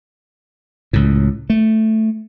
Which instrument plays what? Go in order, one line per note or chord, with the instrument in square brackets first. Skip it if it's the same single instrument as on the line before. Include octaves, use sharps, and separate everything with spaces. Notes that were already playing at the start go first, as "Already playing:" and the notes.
[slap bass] C#2 A2
A3